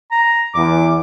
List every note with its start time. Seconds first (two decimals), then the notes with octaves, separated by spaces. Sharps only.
0.12 A#5
0.54 E2 D6